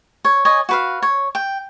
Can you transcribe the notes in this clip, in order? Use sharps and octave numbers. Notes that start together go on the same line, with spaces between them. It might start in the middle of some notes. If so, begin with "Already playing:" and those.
C#5
C#5 D#5 G#5
F#4 B4 F5
C#5
G5